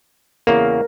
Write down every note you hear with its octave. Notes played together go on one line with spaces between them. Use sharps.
E2 C#3 A#3 A#4